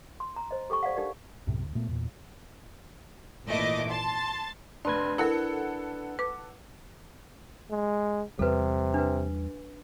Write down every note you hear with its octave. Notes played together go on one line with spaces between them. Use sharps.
C6
A#5
C5 D#5
G4 A4 G5 C#6
C5 D5 F5 F#5
D4 D#4 G4 A#4 D5
B1 F#2 A2 C3
D2
A#2 A3 B3
E2 A#2
G#1 A#2 E3 A3 D#5 D6
A5 C6 A6
F1 D4 B4 C6 G#6
E4 A4 A#4 F#5
B4 D6
G#3
E2 C3 G3 A4 B4
D4 B4